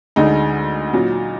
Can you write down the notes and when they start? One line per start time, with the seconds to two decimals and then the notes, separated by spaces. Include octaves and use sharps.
0.16 D2 D3 G#3 D#4
0.93 A#2 F#3